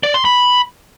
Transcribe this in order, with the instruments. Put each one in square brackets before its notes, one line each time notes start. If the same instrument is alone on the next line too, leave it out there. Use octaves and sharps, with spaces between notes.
[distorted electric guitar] D5
C6
B5